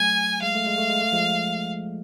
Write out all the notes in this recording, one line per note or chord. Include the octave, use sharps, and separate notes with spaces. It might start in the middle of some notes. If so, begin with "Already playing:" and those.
Already playing: F#3 A3 G#5
G#3 F5
A3
G#3
A3
G#3
A3
F3 G#3